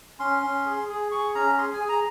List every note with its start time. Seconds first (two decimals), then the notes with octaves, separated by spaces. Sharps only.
0.19 C#4 C6
0.43 C#4
0.66 G#4
0.89 G#4
1.12 G#4 C#6
1.35 C#4 A#5
1.57 G#4 C6
1.73 G#5
1.80 G#4
1.89 A#5